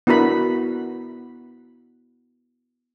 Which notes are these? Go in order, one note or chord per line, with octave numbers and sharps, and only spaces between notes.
B3 D4 E4 F#4 A#4 B5